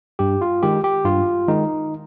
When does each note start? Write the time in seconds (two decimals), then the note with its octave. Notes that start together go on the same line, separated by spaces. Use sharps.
0.19 G2 G4
0.41 F4
0.63 D#3 G#3 G4
0.84 G4
1.05 G2 F4
1.48 D#3 G#3 D#4